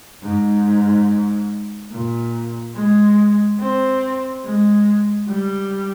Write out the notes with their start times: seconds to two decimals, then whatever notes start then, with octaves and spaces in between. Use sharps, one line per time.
0.23 G#2
1.91 A#2
2.75 G#3
3.59 C4
4.44 G#3
5.29 G3